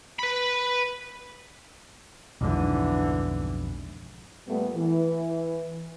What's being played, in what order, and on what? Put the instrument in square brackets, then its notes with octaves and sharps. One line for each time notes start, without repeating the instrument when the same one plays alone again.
[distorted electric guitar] B4 B5
[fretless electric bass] B1 F2 G#2 [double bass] D3 E3
[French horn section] A#2 G3 A3 B3
E3